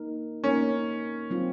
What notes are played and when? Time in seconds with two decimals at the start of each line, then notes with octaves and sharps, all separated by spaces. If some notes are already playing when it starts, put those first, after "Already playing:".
Already playing: A#3 D#4 A#4
0.44 A#3 C#4 D#4 A#4
1.30 F#3 C4 F4